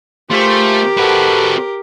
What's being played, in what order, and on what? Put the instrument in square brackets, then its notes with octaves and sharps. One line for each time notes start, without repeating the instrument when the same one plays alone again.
[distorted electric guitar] A3 [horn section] F4 G#4 C5 [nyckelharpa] G4 A#4
[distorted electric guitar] C4 F#4 [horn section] A4 B4